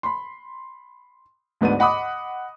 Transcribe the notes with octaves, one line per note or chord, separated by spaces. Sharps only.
B5 C6
D2 G#2 B3 D4 D#7
D#5 F#5 B5 D6 D#6